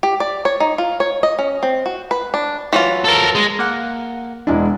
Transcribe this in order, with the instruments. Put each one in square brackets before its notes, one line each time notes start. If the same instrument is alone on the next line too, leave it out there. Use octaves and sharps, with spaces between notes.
[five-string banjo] G4
D5
C#5
D#4
F4
C#5
D#5
C#4
C4
F#4
B4
D4
E3 F#3 F4
[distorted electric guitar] A4 A#4
G#3
[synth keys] A#3 F#5
[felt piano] E1 G#3 E4 [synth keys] D4